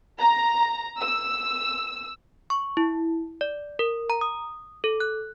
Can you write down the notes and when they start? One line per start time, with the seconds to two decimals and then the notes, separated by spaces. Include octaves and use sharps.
0.19 A#5
1.00 E6
2.50 C#6
2.77 E4
3.41 D5
3.79 A#4
4.10 A#5
4.21 D#6
4.84 A4
5.00 F#6